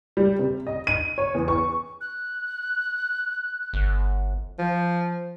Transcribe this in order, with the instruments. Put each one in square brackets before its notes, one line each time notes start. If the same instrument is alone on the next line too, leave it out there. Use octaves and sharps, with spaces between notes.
[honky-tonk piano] G3
C3
D#5
D#7
C#5
E2
C#6
[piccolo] F#6
[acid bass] G1
[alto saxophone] F3